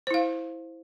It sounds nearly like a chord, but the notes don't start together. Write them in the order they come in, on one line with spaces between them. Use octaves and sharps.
C5 E4 F5